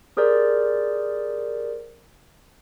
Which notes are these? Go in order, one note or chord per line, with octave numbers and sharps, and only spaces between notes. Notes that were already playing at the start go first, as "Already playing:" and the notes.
G4 G#4 A#4 C5 D5